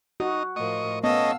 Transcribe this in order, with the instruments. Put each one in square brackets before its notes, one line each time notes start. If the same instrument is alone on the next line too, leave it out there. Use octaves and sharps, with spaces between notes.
[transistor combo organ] D#4 [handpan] F#4
[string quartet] A2 F3 A#4 [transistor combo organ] D#5 C#6
[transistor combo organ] A3 C#4 [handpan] B3 [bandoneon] D#5 [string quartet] F5 A5 E6